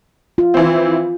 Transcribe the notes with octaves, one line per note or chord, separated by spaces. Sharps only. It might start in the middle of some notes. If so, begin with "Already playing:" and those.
F4
E3 C4